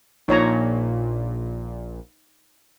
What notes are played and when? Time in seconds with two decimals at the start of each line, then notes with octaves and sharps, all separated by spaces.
0.28 A#1 A#2 D#4 C#5 A#5